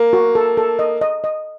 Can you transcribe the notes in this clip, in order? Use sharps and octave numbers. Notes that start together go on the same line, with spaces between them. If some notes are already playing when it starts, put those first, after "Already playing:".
Already playing: A#3
F#4
A4
A4
D#5
D#5
D#5